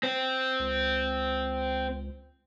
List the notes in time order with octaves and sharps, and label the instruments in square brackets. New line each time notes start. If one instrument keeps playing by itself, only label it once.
[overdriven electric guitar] C4
[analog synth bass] C#2